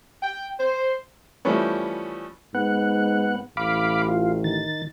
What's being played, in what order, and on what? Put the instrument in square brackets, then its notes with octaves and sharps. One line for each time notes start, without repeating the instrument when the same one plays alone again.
[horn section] G5
C5
[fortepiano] E3 F3 G3 A3 B3 C#4
[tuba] G#2 [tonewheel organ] B3 F#5
[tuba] A1 [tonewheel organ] F5 B5 D6
[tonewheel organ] F4
D#3 A6